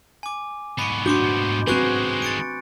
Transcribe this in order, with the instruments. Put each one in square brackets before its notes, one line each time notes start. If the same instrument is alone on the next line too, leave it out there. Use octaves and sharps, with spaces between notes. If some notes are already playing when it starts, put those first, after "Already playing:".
[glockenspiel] G#5 D6
[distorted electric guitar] G#2 B3 [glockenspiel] B5 C#6
[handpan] A3 D4 F#4 [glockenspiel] C6 D6 G6
[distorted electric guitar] D#3 G#3 [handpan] C4 F#4 B4 [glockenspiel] G#5 C#6 F#6
[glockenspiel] A6 C#7 D7